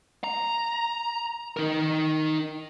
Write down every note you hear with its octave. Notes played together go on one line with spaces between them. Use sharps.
A#5
D#4 A#4